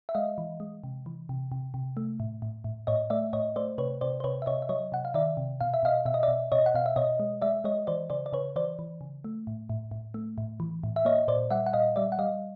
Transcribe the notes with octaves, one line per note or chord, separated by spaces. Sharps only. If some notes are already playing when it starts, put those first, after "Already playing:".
E5
G#3 D#5 F5
E3
G#3
C3
E3
C3
C3
C3
A3
A2
A2
A2
A2 C#5 D#5
A3 D5 E5
A2 C#5 D#5
A3 C5 D5
C3 B4 C#5
C3 C5 D5
C5
C3 B4 C#5
E5
C3 C#5 D#5
E5
F#3 C#5 D#5
C3 F#5
F5
D#3 D5 E5
C3
B2 F5
E5
B2 D#5 F5
B2 E5
D#5
D5 E5
B2
B2 C#5 D#5
F#5
B2 F5
E5
B2 C#5 D#5
G#3
G#3 D5 E5
G#3 C#5 D#5
E3 C5 D5
C#3 C5 D5
D5
C#3 B4 C#5
E3 C5 D5
E3
C#3
A3
A2
A2
A2
A3
A2
E3
A2
E5
A#3 C#5 D#5
A#2 C5 D5
G3 E5 F#5
F#5
A#2 D#5 F5
G3 D5 E5
F#5
G3 D#5 F5